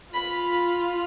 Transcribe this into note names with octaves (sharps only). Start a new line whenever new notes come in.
F4 B5
B5